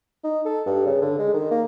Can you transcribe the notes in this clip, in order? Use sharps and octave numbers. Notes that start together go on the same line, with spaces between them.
D#4
A4
G2
C#3
D3
G#3
D#3
A#3